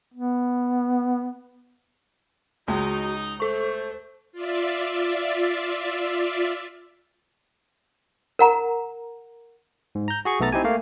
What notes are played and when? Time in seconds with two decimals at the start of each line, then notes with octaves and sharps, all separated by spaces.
0.14 B3
2.68 C#2 G#3 D#4 F#4
3.40 A3 A4 C5 C#6
4.32 F4 D5 E5
8.39 A#4 F#5 A#5
9.95 G#2
10.08 A#5 G6
10.25 F#4 G#4 C#6
10.40 B1 A3 B3 A4 A#5 A6
10.52 C4 D#4 E4 G4 G#5
10.64 A3 A#3 F5